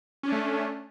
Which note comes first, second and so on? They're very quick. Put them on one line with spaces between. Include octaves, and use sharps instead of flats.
C#4 D4 A3